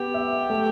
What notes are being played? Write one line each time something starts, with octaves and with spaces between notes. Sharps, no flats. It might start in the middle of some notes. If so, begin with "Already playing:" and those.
Already playing: B3 G4
E5
A3